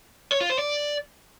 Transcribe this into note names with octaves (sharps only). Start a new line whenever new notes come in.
C#5
F4
C5
D5